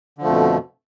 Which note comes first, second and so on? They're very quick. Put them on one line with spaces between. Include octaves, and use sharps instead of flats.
D3 F3 A3 F2 B2